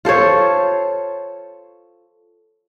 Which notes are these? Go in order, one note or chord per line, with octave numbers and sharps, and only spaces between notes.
F4 A4 C5 C#5